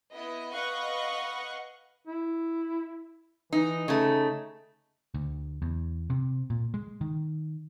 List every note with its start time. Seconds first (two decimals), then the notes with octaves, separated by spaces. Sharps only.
0.12 B3 E4 D#5
0.53 B4 D#5 F5 F#5 C#6 F#6
2.07 E4
3.53 E3 D#4
3.88 C#3 A3 D#4
5.14 D2
5.62 E2
6.10 C3
6.50 A#2
6.74 G#3
7.01 D#3